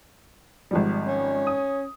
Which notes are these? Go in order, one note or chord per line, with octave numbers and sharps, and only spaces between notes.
G#1 F3 G3
C#4
D#6